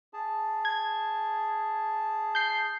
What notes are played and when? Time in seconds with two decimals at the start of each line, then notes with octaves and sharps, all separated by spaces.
0.13 G#4 A5
0.65 G#6
2.35 G6 C7